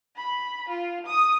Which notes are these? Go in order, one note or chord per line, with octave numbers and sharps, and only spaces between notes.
B5
F4
D#6